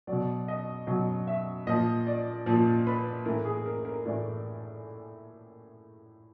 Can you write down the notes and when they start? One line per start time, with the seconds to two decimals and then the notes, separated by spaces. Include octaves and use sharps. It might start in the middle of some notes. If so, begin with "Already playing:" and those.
0.07 B2 F#3 D5
0.48 D#5
0.87 B2 F#3 D#5
1.27 E5
1.67 A#2 F3 D#5
2.07 D5
2.46 A#2 F3
2.87 B4
3.25 A2 E3 A#4
3.45 G#4
3.66 A#4
3.85 A#4
4.06 A2 E3 D5